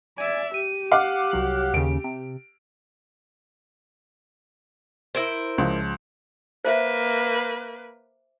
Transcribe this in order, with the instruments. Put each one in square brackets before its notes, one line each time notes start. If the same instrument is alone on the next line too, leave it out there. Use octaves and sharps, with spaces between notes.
[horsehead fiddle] D5 E5 [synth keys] G#5
[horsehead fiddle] G4 [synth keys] D#7
[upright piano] F5 F#5 D6
[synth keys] C2 F#3 F#6
[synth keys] D#2 C#3 [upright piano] D7
[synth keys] C3
[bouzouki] E4 A#4 C5
[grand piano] C#2 F3
[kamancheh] A#3 B4 [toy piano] C5 E5